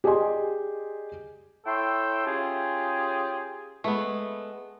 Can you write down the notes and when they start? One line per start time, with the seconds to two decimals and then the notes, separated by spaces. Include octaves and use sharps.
0.04 G4 G#4 D5 D#5 G#5 C6
1.66 E4 A4 C#5 E5 G5 C6
2.26 C#4 F4 G4 G#4
3.84 G#3 A3 B3 B4